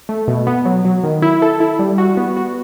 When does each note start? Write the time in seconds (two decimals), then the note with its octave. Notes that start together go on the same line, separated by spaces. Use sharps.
0.09 A3
0.28 B2
0.47 B3
0.65 F#3
0.85 F#3
1.03 D#3
1.22 E4
1.42 A4
1.60 E4
1.79 G3
1.98 F#4
2.17 B3
2.37 F#4